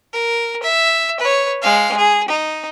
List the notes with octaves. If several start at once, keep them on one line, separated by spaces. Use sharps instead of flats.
A#4
E5
B4 C#5
G#3 F5
G#4
D#4